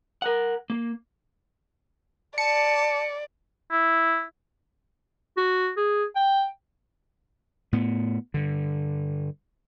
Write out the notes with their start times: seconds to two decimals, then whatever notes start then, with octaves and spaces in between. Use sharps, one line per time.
0.22 A#4 F#5
0.70 A#3
2.38 D5 A5 C#7
3.72 E4
5.37 F#4
5.77 G#4
6.16 G5
7.73 A2 B3
8.34 G2 D3